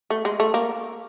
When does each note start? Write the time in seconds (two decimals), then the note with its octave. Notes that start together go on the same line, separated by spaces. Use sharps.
0.10 A3
0.25 G#3
0.40 A3
0.54 A#3